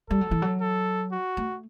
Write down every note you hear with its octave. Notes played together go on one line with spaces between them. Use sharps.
G3 A4
F#3
E3
F#3
A4
F#4
A3